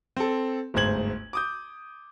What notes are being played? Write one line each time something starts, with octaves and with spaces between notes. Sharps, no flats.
C4 A4
G1 D2 G#2 C5 G#6 F#7
D6 D#6 G6